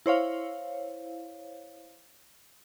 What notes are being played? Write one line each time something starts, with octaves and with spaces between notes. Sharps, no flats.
E4 C5 C#5 F5